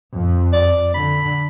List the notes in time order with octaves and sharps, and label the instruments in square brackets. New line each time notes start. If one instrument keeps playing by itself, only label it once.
[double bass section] F2
[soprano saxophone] D5
[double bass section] D3 [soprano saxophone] B5